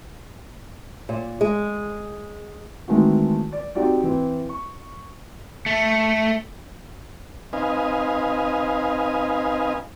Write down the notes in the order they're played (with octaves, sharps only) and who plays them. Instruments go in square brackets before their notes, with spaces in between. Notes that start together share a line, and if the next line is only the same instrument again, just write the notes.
[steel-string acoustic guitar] A#2
G#3
[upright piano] D#3 E3 G#3 A3 C4 F#4
D5
C4 D#4 F#4 G4 D5
E3 C4
C#6
[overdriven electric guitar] A3
[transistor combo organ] C4 D#4 B4 D#5 F5 G#5